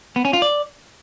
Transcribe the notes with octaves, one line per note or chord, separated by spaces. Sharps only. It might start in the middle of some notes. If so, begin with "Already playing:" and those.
B3
C#4
F4
D5